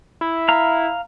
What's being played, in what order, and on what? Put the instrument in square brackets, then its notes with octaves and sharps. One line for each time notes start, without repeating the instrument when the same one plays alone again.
[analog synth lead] E4
[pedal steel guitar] F5 A#5